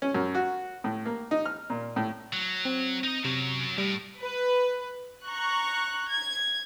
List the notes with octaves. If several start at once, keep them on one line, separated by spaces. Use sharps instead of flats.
C#4
F#2
F#4
A2
A#3
D#4
F6
A#2
A2
F#3
C4
D#4 D#5
C3 F#3 C#4
A2 G3
B4
A#5 C#6 F#6
G#6